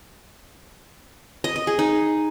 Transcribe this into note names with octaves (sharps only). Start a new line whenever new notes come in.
D#5
D#5
G#4
D#4